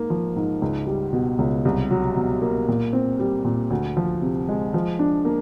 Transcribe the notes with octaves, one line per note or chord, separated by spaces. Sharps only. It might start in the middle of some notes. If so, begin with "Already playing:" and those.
Already playing: G#2 A#3
F3
G#2
C#2
G3
B2
C#2
C2
F#3
B2
A#3
A#2
C4
G3
A#2
D2
F3
C3
G#3
F3
D4
A#3